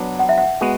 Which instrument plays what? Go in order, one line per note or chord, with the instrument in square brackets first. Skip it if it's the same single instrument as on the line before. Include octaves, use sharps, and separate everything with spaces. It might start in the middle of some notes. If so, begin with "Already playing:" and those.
Already playing: [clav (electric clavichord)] F#3 B3 D4
[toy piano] F#5
E5
F#5
[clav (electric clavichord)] G#3 B3 F#4